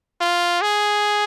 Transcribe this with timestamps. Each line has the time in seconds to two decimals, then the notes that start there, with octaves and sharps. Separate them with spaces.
0.21 F4
0.62 G#4